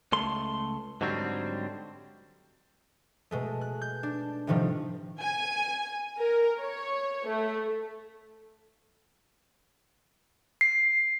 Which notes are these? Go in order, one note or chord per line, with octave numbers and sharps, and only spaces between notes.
C#2 A3 C6
G#2 D3 F#3 G3 C4
B2 G#3 A3
F#6
G6
D4
A2 C3 D#3 F3 G3
G#5
A#4
C#5
A3
C7